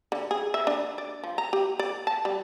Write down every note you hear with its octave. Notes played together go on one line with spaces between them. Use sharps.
D3
G#4
E5
D4
D5
F3
A#5
G4
D5
A5
G3